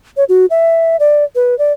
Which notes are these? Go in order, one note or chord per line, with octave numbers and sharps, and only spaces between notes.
C#5
F#4
E5
D5
B4
D5